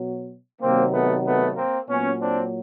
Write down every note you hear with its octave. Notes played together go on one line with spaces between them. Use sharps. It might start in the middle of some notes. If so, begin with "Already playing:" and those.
Already playing: B2 F#3
C3 D#3 F#3 A#3 C4
A3 B3
A3 B3
A#3 C4
A#2 F#3 B3 C#4
C4 D4